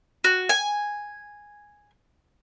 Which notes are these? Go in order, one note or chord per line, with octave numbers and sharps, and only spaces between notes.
F#4
G#5